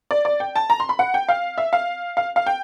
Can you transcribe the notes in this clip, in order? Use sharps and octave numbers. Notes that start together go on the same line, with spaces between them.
D5
D5
G5
A5
A#5
C6
B5
F#5
G5
F5
E5
F5
F5
F5
G5